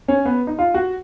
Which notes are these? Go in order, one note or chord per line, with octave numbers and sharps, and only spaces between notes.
C#4
B3
D#4
F4
F#4